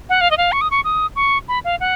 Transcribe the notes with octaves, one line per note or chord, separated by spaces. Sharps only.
F#5
F5
D#5
F5
C#6
D#6
C#6
D#6
C#6
B5
F5
F#5